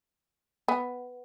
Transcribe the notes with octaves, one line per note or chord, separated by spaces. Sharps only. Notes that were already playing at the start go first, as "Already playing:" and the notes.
B3